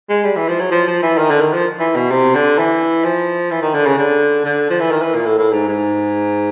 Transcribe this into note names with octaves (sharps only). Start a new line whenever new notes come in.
G#3
G3
E3
F3
F#3
F3
F3
E3
D#3
D3
D#3
F3
E3
B2
C3
D3
E3
F3
E3
D#3
D3
C#3
D3
D3
F3
E3
D#3
E3
A#2
A2
A2
G#2
G#2